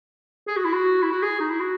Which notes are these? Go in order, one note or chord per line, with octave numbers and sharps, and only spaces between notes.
G#4
F#4
E4
F#4
E4
F#4
G#4
D#4
E4
F#4